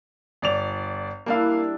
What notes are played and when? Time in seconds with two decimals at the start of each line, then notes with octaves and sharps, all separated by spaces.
0.42 G1 D5 F7
1.26 G3 A#3 D4 E4 F5